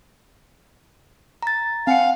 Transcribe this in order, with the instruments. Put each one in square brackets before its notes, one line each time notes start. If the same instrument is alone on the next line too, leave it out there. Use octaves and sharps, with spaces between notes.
[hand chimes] A#5 A6
[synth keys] C4 F#5 [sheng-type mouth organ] F5 [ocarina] G#5